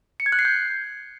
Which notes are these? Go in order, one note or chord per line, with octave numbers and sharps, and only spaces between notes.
C#7
G#6
F#6
C7
G6